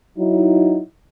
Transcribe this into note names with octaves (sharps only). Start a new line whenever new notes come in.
F#3 D#4 E4